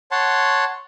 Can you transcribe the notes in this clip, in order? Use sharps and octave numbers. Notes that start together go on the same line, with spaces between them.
C#5 F#5 A5 C6